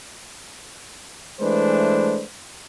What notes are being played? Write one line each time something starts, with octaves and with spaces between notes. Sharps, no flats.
E3 G#3 A3 D4 B4 C5